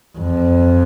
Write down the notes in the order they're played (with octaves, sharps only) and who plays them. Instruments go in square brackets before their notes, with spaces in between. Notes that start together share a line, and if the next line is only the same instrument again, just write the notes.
[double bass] F2